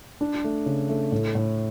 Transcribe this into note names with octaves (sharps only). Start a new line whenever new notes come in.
D4
A3
C#3
A3
A2
A2